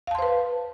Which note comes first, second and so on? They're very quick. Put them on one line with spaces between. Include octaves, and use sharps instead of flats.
F5 A5 C6 C5 B4